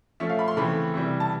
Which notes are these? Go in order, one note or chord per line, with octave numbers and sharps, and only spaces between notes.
F3 A3 C#4 E5
F5
B5
C6
C#3 E3 A3 C4 B5
C3 E3 G3
A5